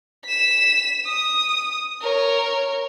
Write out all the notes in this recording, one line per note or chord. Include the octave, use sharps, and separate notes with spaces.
B6 E7
D#6
A#4 C#5